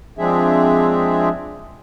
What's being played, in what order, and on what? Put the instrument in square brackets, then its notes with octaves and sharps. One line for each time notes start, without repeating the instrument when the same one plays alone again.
[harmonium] F3 G#3 C4 D4 G#4 E5